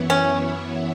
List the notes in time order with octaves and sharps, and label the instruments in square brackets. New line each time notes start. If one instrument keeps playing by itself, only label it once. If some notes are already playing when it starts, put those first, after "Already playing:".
Already playing: [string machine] F#2 E3 B3 E4 C#5
[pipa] C#4